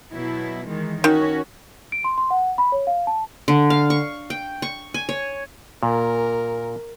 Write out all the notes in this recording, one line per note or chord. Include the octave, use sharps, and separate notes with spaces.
B2 F#3 E4
D#3 E3 G#3
D#3 C#4 F#4
D7
C6
C6
F#5
B5
C#5
F5
A5
D3
F5
C#6
G5
C#6
G#5
C#5
A#2 A#4